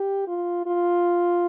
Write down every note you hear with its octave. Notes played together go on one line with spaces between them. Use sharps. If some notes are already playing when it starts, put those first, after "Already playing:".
Already playing: G4
F4
F4